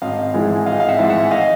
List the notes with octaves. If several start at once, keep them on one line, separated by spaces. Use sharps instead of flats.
G#1 D#5 F5
G#2 E3 G#3
G#1 D#5 F5
F5
E5 F#5
G#2 E3 G#3
E5 F#5
D#5 F5